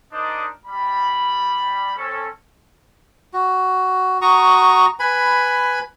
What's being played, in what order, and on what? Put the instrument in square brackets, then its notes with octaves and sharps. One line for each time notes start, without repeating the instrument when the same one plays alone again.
[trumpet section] D4 D#4 A#4 C5 D5 D#5
G3 B5
C4 C#4 A4
[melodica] F#4
F#4 A#5 C#6 D#6
B4 G#5 B5